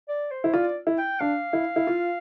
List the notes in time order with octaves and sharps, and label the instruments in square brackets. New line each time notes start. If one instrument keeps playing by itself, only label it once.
[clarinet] D5
C5
[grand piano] E4
[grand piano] F4 [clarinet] D5
[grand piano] E4
[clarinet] G5
[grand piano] D4 [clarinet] F5
[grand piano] E4
E4
F4